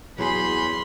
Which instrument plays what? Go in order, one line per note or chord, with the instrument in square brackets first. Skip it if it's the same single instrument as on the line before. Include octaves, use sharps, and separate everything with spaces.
[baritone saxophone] E2 [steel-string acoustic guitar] F#3 G#4 [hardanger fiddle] B5 C6